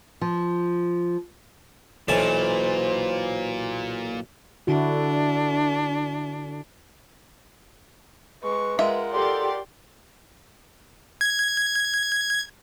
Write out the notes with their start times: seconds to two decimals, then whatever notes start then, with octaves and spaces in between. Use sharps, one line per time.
0.21 F3
2.08 B1 A#2 E3 C5 A5
4.67 D3 D4 E4 F#4
8.43 G#3 B4 C#6
8.79 G#3 F4 A#4 E5 F#5
9.13 G4 A4 D5 C6
11.21 G#6